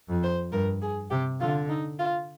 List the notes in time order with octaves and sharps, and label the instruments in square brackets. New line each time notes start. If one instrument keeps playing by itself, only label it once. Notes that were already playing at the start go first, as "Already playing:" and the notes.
[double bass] F2
[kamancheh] C5
[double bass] G2 [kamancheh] A#4
[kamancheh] G#4
[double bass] C3 [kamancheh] G4
[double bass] D3 [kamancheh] F4
[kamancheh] D#4
F4